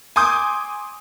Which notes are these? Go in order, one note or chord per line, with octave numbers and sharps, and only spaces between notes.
G#5 C6 D6 D#6 G6